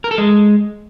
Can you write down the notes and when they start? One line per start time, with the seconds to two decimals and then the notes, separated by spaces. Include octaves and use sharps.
0.04 A#4
0.11 A4
0.18 G#3